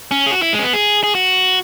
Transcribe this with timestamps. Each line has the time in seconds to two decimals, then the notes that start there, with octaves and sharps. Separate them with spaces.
0.11 C#4
0.26 G#4
0.32 F#4
0.42 E4
0.53 G#3
0.59 C#4
0.63 B3
0.73 G#4
1.04 G#4
1.15 F#4